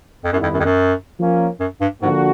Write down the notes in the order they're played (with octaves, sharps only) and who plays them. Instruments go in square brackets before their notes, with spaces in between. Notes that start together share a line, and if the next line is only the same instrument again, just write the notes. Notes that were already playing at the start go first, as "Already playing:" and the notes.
[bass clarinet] F2
[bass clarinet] F#2 [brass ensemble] D#3 G3 B3 E4
[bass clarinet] F2
F#2
F2
F#2
[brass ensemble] F3 A#3 C#4
[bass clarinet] F#2
G2
[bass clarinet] G#2 [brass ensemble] D3 F3 A#3 D4 F#4